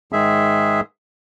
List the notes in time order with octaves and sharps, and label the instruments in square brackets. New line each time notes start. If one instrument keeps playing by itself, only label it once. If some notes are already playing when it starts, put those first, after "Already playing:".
[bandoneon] G#2 D#3 G#3 G#4 E5